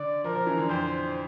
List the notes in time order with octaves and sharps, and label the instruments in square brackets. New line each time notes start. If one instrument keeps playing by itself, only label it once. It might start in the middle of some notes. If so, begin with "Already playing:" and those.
Already playing: [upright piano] D3 [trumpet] D5
[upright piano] F3 [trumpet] A#4
[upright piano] F3
E3
D3
[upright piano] F2 [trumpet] C5